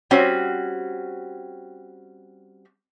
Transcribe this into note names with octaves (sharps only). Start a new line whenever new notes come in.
G3 C4 C#4 F#4